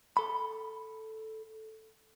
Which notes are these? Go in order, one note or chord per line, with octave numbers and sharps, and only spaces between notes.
A4 B5